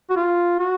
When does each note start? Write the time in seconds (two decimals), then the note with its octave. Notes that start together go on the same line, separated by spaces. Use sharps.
0.10 F#4
0.16 F4
0.59 F#4